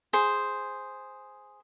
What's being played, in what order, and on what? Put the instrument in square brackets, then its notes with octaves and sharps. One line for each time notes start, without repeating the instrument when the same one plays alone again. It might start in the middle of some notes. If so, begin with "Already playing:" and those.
[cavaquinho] G#4 C5